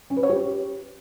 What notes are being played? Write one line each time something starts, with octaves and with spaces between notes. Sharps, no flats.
C#4
B4
C#5
G4